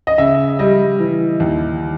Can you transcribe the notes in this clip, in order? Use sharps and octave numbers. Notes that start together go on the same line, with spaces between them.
D#5
C#3 E5
G3 D#5
E3
D#2